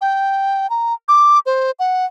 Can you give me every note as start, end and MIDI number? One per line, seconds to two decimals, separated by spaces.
0.01 0.69 79
0.70 0.94 82
1.08 1.39 86
1.46 1.71 72
1.79 2.05 78